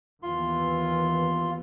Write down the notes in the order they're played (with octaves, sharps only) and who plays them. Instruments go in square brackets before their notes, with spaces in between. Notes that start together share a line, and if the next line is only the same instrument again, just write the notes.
[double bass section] D#2 E3 B3 [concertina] F4 C6